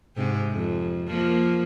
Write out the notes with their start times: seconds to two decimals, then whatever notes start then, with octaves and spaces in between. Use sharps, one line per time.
0.16 G#2 C3 G4
0.51 F2
1.08 F3 A#3